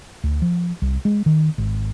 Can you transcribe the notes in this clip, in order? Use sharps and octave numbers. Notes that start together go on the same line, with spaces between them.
D2
F3
C2
G#3
D#3
G#1